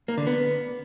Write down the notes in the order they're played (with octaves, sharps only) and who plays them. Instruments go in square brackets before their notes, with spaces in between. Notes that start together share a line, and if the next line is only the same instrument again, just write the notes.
[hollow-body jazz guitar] A#3
D3
B3